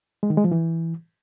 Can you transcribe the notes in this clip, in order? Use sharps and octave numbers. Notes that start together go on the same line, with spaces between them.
G#3
D#3
G#3
F3
E3